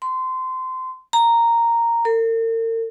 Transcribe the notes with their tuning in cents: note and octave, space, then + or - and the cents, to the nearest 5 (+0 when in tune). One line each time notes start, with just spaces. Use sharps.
C6 -20
A#5 -5
A#4 -45